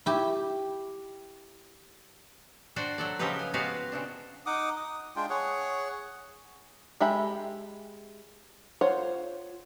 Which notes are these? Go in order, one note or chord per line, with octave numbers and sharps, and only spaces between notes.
E4 G4
D4 F#4 C5 D5 G5
F#3 A4 D5
C#3 F3 F#3 D#4 G4 B4
G#5
G#3 B3 F#4 G4 B4 F5
C#3 C4 D4
D#4 F#5 D6 D#6
D#6
G#3 D4 F4 G5
G#4 C#5 F#5
G#3 G4 A4 E5 B5
F4 C5 C#5 F#5